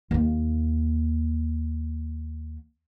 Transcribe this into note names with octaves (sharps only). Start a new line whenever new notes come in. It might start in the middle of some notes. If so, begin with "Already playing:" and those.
D#2 A#3